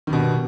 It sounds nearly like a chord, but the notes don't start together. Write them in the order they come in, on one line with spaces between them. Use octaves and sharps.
D#3 G2 B2